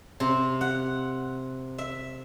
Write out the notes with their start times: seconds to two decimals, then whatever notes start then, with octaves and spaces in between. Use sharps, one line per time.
0.20 C3
0.61 F#5
1.78 E5